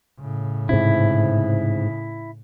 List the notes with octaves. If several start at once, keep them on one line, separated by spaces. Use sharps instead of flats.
A2 C#3
G#2 C3 E4